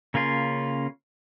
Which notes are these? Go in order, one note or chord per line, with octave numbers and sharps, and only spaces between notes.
C#3 A#3 C#4 F4